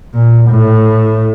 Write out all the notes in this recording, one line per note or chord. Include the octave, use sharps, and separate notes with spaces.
A#2
A2